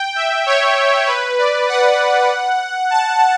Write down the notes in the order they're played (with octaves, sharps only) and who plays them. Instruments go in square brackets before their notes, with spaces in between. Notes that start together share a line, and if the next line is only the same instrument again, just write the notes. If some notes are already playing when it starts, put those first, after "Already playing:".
Already playing: [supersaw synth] G5
E5
C#5
B4
D5
F#5
A5